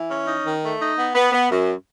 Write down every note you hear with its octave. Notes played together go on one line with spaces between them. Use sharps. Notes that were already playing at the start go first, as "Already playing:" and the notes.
Already playing: E3
C#4
D#4
D#3
A3
D#4
B3
B3
B3
F#2